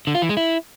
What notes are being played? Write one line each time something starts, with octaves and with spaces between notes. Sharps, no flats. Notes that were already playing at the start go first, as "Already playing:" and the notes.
D3
F4
E3
G#3
E4